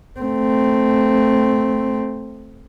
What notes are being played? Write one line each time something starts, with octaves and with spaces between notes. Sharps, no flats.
A3 C4